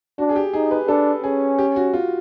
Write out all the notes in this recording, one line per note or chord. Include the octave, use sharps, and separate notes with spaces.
D4 F#4
G#4
G4
D#4 G#4
B4
D4 A4
C#4 G#4
G4
F#4
F4